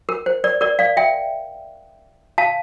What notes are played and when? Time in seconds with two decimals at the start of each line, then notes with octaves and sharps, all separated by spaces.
0.09 A#4
0.26 C5
0.44 A#4 D5
0.61 A#4 D5
0.79 D5 F5
0.97 E5 G5
2.38 F5 A5